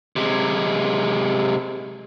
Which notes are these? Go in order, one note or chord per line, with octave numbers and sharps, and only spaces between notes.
C3 G#3